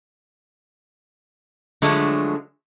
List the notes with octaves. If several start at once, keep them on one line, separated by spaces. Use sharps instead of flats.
D3 F3 F#3 G#3 A3